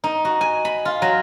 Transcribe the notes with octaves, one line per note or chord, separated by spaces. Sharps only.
D#4
F#4
G#5
B5
F4
F#3